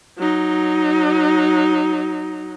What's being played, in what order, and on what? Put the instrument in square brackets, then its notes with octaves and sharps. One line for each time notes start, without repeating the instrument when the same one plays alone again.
[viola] F#3 D#4